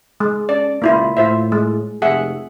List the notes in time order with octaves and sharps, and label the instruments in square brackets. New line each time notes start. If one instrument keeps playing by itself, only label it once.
[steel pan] G#3
[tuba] C#4 [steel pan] D5
[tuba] C#2 [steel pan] A#3 E4 F4
[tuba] A2 [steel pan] F4 C5 E5
[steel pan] G#3
[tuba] F1 [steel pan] G#4 E5 F#5